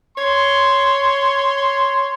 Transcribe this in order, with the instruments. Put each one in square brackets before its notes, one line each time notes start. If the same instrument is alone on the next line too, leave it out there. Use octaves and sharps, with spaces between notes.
[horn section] C#5 C6